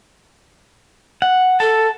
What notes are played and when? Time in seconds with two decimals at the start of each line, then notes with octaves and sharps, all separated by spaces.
1.22 F#5
1.60 A4 A5